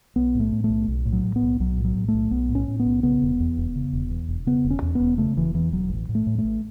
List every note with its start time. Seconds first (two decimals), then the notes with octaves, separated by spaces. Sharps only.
0.16 B1 B3
0.35 A2 A3
0.52 A2
0.64 A3
0.70 B1
0.88 B1
1.06 A2
1.13 F#3
1.23 A2
1.36 B3
1.43 B1
1.60 B1 F#3
1.78 A2
1.84 F#3
1.95 A2
2.08 A3
2.14 B1
2.31 B1 B3
2.49 A2
2.55 C#4
2.68 A2
2.80 B3
2.86 B1
3.03 C#3 B3
3.22 E1
3.40 E2
3.57 E1
3.75 C#3
3.93 E1
4.10 E2
4.29 E1
4.46 C#3 B3
4.64 E1
4.70 C#4
4.82 E2
4.95 E1 B3
5.18 C#3 A3
5.36 E1 E3
5.54 E2 E3
5.73 E1 F#3
5.90 A1
6.09 A2
6.15 A3
6.27 A2
6.38 A3
6.45 A1